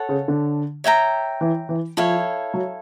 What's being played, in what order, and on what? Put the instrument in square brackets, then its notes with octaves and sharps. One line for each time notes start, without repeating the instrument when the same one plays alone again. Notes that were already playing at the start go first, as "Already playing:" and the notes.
Already playing: [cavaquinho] A4 C#5 F#5
[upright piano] C#3
D3
[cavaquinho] C#5 E5 G5 A#5
[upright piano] E3
E3
[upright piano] F3 [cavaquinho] E4 A4 C#5 F5
[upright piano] F#3